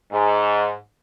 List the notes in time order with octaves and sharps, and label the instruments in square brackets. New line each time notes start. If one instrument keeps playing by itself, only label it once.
[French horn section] G#2